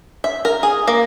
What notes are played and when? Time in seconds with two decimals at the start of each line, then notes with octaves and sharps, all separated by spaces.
0.24 E5
0.45 A#4
0.63 G#4
0.87 A#3